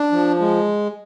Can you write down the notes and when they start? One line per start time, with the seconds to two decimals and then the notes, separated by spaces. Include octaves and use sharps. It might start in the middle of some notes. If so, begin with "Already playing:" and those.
Already playing: D4
0.12 F3
0.40 G#3